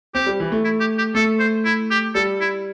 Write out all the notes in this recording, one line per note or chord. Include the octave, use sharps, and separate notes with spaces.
C4 G4
G3
E3
A3
E4
G4
G4
A3 A4
C5
E4
G4
G3 A4
E4